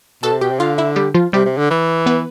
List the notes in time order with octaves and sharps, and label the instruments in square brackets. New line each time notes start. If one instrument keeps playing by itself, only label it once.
[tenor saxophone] B2 [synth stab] A4 A5
[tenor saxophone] C3
[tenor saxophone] B2 [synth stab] G4 G5
[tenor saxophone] C3
[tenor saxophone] D3 [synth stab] F4 F5
[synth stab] E4 E5
G3 G4
F3 F4
[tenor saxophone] C3 [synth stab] G3 G4
[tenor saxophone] C3
D3
E3
[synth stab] B3 B4